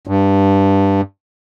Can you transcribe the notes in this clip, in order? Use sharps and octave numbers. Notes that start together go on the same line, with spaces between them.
G2